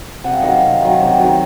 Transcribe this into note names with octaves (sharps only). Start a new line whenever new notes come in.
C3 F#5
F5
D#3 F#3 D#5
F5
C3
D#3 F#3
C3
D#3 F#3